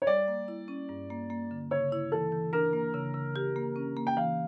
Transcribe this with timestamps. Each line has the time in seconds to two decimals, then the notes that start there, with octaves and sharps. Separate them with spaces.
0.02 C#5
0.07 G3 D5
0.28 A#3
0.48 E4
0.68 C#4
0.89 G2
1.10 A#3
1.30 A#3
1.51 D3
1.71 C#3 C#5
1.92 E4
2.12 E3 A4
2.32 E3
2.53 D4 A#4
2.73 A#3
2.94 C#3
3.14 C#3
3.36 G4
3.56 A#3
3.76 C#4
3.97 A#3
4.07 G5
4.17 E3 F5